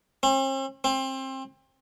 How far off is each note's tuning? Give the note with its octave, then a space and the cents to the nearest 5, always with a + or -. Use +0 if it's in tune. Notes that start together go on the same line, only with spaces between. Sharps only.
C4 +45
C4 +25